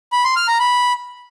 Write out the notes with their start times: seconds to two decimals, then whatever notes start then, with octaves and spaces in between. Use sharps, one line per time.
0.12 B5
0.24 C6
0.36 F6
0.48 A#5
0.60 B5